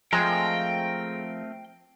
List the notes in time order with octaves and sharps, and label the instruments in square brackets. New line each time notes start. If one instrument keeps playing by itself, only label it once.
[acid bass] F3 [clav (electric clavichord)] G#3 [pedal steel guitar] A3 C4 A#4 [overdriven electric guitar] G5